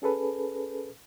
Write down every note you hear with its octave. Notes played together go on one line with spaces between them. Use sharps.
C#4 G#4 A4 B4